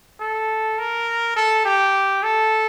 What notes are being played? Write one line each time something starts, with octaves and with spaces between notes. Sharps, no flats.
A4
A#4
A4
G4
A4